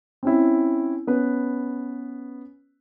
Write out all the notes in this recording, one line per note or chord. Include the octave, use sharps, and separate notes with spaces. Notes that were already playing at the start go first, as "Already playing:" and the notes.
C4 C#4 E4
B3 C#4 B4